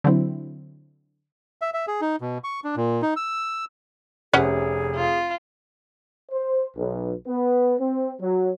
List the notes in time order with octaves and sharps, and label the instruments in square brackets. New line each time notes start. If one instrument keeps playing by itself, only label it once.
[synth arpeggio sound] D3 F#3 C4 E4
[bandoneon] E5
E5
G#4
D#4
B2
C#6
D4
A#2
D#4
E6
[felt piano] F1 C3 C#5 [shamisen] C#4 B4 F#5 [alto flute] G#4
[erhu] F4
[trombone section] C5
B1
B3
C4
F#3